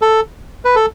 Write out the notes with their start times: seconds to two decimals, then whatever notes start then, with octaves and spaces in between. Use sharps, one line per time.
0.02 A4
0.65 B4
0.75 A4